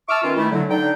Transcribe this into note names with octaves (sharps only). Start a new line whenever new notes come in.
E5 A5 C#6 D6 E6 F6
D#3 B3 C#4 F4
D#3 A3 E4
D3 F#3
D3 D#4 G5